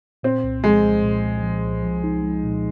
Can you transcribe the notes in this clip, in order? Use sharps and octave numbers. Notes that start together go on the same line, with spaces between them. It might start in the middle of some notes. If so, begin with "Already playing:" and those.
A#2 C4
C2
F3 G#3
C2
A#2
C2
F3
C2
F3
D#4
G#3
A#2